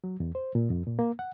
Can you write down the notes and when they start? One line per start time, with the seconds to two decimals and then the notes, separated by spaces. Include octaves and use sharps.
0.04 F#3
0.20 E2
0.35 C5
0.55 A#2
0.70 F2
0.87 A#2
0.99 A#3
1.19 F#5